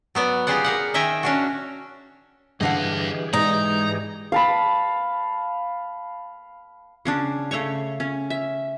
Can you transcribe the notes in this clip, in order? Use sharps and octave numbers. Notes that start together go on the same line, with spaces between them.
F#3 B3 D5
F4 G4 G#4 C5 D5 F#5
A#4 F5 F#5
D#3 E5 G5 G#5 A#5
C#4 D4 F#4
G2 D3 E3 G4 G#4 D#5 F5 F#5
G#2 D#4 A#5
F5 A5 B5
C#3 C#4 D4
C#3 A3 C#5 C#6
C#4
E5